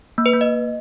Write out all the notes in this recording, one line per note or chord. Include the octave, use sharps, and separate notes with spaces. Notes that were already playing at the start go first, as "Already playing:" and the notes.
A#3
B4
A#3
D#5